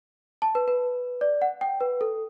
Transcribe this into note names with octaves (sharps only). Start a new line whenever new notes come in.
A5
B4
B4
D5
F#5
G5
B4
A4